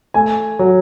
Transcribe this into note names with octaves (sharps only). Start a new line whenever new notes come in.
A3 G#5
F#3